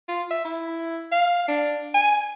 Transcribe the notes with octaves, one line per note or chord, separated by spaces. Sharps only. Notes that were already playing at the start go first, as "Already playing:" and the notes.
F4
E5
E4
F5
D4
G#5